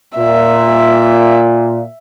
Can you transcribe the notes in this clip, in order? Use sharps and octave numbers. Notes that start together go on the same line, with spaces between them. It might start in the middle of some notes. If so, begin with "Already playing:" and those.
A#2 E5